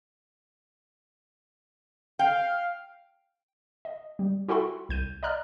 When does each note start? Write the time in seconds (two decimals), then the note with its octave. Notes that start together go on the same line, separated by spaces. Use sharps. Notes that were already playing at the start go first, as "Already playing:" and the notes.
2.19 F5 G5
3.85 D#5
4.19 G3
4.48 E4 F#4 A4 G5 B5 C6
4.89 C2 G6 D#7
5.23 D5 D#5 A#5 F6 F#6